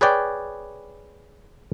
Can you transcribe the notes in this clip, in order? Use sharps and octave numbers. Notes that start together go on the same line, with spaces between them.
G#4 B4 C#5 D5 G5